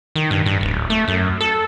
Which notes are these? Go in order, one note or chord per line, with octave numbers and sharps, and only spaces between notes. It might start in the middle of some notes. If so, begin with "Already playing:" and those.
D#3
G2
G2
D1
A3
F#2
A4